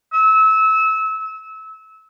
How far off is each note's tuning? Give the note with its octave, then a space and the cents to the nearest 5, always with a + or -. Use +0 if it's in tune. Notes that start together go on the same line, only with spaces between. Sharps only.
E6 -25